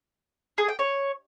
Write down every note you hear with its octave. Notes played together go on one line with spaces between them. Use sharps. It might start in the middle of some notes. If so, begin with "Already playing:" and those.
G#4
G5
C#5